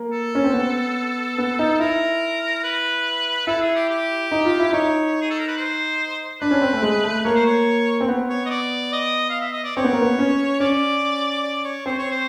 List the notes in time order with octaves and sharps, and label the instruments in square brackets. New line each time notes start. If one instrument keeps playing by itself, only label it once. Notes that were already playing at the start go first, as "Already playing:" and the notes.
Already playing: [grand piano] A#3
[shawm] A4
[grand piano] C#4
C4
B3
B3
D#4
[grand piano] E4 [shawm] A#4
[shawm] B4
[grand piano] E4 [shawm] A4
[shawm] G#4
G4
G4
[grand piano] D#4
F4
E4
[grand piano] D#4 [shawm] C#5
[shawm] G#4
A4
A#4
B4
C5
[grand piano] D4 [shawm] B4
[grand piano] C#4
C4
A3
G#3
A3
[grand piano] A#3 [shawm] C#5
[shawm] C5
C#5
[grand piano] C4
B3
[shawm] C#5
D#5
D5
D#5
F5
E5
D#5
D5
[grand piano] C4 [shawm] C#5
[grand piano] B3
A#3
B3
C#4
[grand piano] C#4 [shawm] D5
[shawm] D5
C#5
[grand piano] C4 [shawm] C5
[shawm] C#5
C5